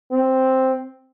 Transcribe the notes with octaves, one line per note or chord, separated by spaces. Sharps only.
C4